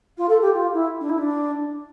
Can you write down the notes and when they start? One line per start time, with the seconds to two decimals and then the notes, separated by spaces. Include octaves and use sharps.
0.17 F4
0.28 A4
0.41 G4
0.53 F4
0.73 E4
1.00 D4
1.09 E4
1.18 D4